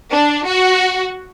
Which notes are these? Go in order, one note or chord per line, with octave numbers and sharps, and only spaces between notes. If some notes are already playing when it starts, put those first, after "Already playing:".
D4
F#4